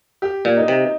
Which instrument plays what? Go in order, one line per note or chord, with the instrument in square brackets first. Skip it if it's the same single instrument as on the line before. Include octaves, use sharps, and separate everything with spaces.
[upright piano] G4
[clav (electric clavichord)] A#2
[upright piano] D#4
[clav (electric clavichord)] C3